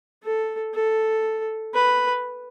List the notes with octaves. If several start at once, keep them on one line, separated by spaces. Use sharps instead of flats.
A4
A4
B4